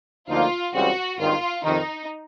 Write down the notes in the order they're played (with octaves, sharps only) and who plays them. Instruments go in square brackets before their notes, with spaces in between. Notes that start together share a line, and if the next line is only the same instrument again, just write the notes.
[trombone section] D2 D3 F3 A#3 D#4 [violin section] F4
[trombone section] C#2 C#3 E3 G3 C4 [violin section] F#4
[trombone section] G#1 G2 D#3 [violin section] F4
[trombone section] F2 C3 D#3 [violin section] D#4